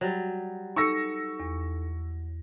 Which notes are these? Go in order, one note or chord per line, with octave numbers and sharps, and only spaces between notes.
F#3 G3
D#4 A4 C#6 E6 A#6 C#7
E2